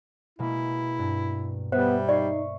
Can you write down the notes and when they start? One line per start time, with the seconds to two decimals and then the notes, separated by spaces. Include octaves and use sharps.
0.39 B2 G#3 A#3 E4
0.98 G2
1.72 G3 B3 C5 E5
2.09 D#4 D5 C#6 C7